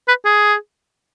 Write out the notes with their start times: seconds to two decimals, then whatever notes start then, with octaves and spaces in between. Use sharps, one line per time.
0.08 B4
0.25 G#4